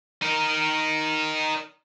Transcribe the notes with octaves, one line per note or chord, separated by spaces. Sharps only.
D#4 A#4